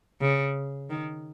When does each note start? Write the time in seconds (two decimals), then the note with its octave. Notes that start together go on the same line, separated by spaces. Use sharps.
0.21 C#3
0.90 D#3